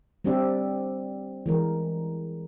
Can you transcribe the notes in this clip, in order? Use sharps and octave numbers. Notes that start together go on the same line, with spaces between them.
G3 C4 D4 G4 D5 E5
E3 G#3 A#4